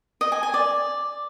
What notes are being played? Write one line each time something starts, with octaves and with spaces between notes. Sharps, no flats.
D#5
G#5
G#5
D5